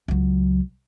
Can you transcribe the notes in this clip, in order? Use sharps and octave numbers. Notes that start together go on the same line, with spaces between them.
C#2 F#3